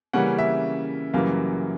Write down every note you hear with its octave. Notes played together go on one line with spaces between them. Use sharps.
C#3 E3 G3 A#3 C#4 F#5
E5
F#2 C#3 E3 G3 A#3 F5